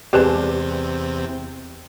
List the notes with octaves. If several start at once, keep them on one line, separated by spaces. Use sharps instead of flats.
E2 C3 G3 G#3 C4 G4 B4 A5